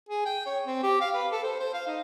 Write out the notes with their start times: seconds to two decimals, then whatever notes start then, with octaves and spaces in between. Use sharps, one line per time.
0.09 G#4
0.25 G5
0.46 C#5
0.66 C4
0.83 G4
1.01 F5
1.15 B4
1.31 A4
1.44 C5
1.60 C5
1.74 F5
1.87 D#4